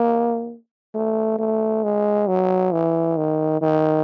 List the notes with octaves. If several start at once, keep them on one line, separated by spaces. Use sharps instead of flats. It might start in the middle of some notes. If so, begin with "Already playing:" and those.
Already playing: A#3
A3
A3
G#3
F#3
E3
D#3
D#3